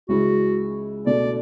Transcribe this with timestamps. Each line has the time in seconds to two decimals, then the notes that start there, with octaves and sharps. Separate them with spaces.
0.09 C#2 C#3 G#3 C#4 E4 F#4
1.06 B2 A3 D4 D5